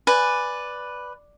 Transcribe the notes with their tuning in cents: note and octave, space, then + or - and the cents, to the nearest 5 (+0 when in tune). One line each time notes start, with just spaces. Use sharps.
B4 +0 D5 +0 G#5 +0